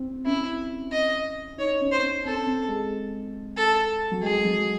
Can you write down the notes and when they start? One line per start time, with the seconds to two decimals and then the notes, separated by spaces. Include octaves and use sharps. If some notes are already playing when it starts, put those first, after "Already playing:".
Already playing: C4
0.26 C#4 E4
0.92 D#5
1.58 D#4 C#5
1.81 C#4
1.92 C5
2.03 C#4
2.25 C4 A4
2.47 C4
2.68 G#3
3.57 A4
4.11 F#3
4.23 G#3 G#4
4.45 F#3